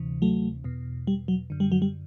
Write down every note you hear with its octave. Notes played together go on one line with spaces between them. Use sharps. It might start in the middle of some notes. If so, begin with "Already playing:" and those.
Already playing: D2 C3 E3
F#3 A3
E2 B2
G3
F#3
F#2 D3
G3
F#3
G3